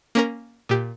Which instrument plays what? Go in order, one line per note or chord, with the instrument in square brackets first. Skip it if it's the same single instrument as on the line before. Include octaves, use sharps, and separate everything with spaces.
[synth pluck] A#3 C#4 A#4
A#2 G4